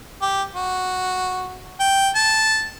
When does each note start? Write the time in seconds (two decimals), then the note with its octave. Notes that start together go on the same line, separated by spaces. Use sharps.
0.22 G4
0.55 F#4
1.80 G5
2.16 A5